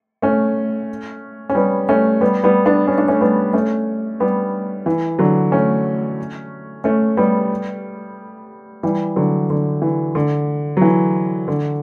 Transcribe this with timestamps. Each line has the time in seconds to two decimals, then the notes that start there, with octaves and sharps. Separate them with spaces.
0.22 A3 C#4
1.49 C#4
1.55 G3 B3
1.89 A3 C#4
2.21 G3 B3
2.44 G3 B3
2.66 B3 D4
2.87 C#4
2.98 D4
3.08 A3 C#4
3.21 G3 B3
3.53 A3 C#4
4.20 G3 B3
4.86 E3
5.19 D3 F#3
5.52 A3 C#4
6.84 A3 C#4
7.17 G3 B3
8.83 E3 G3
9.16 D3 F#3
9.50 D3
9.82 E3
10.15 D3
10.77 F#3
10.81 E3
11.48 D3